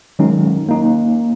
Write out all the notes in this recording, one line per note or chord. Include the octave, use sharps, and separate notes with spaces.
D#3 F#3 G#3 C#4 D#4
A#3 D#4